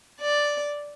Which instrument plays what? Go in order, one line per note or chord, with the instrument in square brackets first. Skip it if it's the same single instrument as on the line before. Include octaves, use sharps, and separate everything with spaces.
[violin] D5